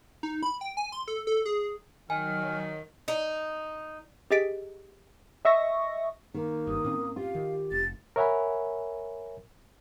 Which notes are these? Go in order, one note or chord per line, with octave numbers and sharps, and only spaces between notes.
D#4
B5
G5
G#5
C6
A4
A4
G#4
D#3 F#3 G#5 F6
D#4
G4 G#4 D#5 A6 B6 D7
D#5 E5 C#6 A#6
D#3 A#3
F#1 G2 D#6
A2 C4 C#4
F4 G4 F5
D#3
F1 A6
A#4 C#5 E5 F#5 G#5 B5